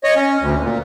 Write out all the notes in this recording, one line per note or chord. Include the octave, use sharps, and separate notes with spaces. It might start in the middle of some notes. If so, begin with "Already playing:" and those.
C#5 D#5
C#4
D2
A#2